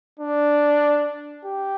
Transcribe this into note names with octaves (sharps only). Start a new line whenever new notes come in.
D4
G4